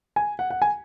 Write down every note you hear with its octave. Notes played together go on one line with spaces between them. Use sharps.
G#5
F#5
F#5
G#5